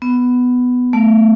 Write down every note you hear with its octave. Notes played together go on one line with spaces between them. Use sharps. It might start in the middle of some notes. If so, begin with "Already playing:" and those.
B3
A3